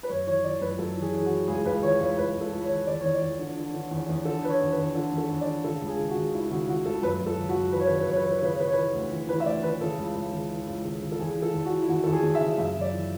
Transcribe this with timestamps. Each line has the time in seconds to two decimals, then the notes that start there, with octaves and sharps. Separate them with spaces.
0.03 B4
0.09 F#2 C#5
0.27 E3 C#5
0.44 E3 D5
0.62 F#2 B4
0.79 F#2 A4
0.97 E3
1.02 G#4
1.13 E3 G#4
1.25 E3 F#4
1.47 C#2 G#4
1.65 C#2 B4
1.83 E3 C#5
2.00 C#2 C#5
2.17 C#2 B4
2.35 C#2
2.41 A4
2.52 C#2
2.64 C#5
2.69 E3
2.87 E2 D5
3.00 E2 C#5
3.14 D5
3.22 E2
3.39 D3
3.56 D3
3.74 D3
3.91 E2
4.09 E2
4.25 D3 A4
4.43 D3 B4
4.49 C#5
4.60 E2
4.72 B4
4.78 E2
4.95 D3 A4
5.12 E2
5.18 A4
5.30 E2
5.41 D5
5.48 D3
5.64 C#3 A4
5.82 C#2
5.87 G#4
5.99 C#3
6.10 F#4
6.16 C#3
6.33 C#2 E4
6.51 C#3 F#4
6.68 C#3 F#4
6.86 C#2 A4
7.02 F#2 B4
7.20 F#2
7.26 A4
7.38 C#3
7.49 F#4
7.55 F#2
7.72 E3 B4
7.80 C#5
7.86 B4
7.90 C#3 C#5
8.02 B4
8.07 F#2 C#5
8.16 B4
8.23 E3 C#5
8.31 B4
8.38 C#5
8.42 C#3 B4
8.52 C#5
8.59 C#3 B4
8.66 C#5
8.73 E3 B4
8.93 D2
9.11 E3
9.29 E3 B4
9.40 E5
9.45 D2 D5
9.63 E3 B4
9.81 C#3 A4
9.98 C#2
10.15 C#2
10.32 C#3
10.50 E3
10.68 C#2
10.85 C#3
11.02 C#3
11.12 A4
11.19 E2 G#4
11.36 E3
11.42 A4
11.53 E2
11.65 F#4
11.72 E3
11.82 E4
11.89 E2 F#4
12.04 E2 A4
12.12 G#4
12.23 E2
12.35 E5
12.41 C#3
12.58 F#2 E5
12.75 F#2
12.81 D5
12.93 E3